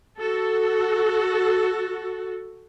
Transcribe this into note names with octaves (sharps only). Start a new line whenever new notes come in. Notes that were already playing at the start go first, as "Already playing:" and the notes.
F#4 A4